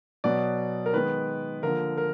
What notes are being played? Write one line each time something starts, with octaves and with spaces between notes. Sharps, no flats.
B2 F#3 B3 D5
A#4
D#3 G#3 B3 B4
D3 F3 A#3 A#4
A#4